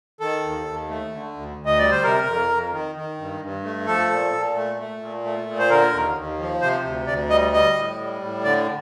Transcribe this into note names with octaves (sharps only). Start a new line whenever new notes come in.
D#3 A4
D#2
D#2
A3
D3
D2
D2
D#5
G3 D5
C5
C3 A#4
F2
F2
D#3
D#3
G2
G2
A3
F3 A4
A#2
A#2
A3
A3
A#2
A3
A#2
C5
D3 A#4
D#2
D#2
F3
C3 C5
D2
D2 D5
G3 D#5
G3 D#5
A2
G3
A2
D3 D5